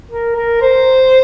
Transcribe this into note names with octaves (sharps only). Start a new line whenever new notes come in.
A#4
A#4
C5